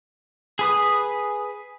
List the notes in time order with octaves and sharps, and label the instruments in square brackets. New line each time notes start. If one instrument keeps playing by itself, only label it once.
[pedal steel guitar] G#4 B4 D#6